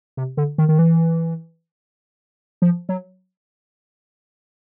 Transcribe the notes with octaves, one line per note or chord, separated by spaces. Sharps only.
C3
D3
D#3
D#3
E3
F3
F#3